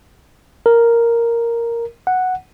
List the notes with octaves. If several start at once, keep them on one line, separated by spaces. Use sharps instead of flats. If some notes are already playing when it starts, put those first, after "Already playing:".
A#4
F#5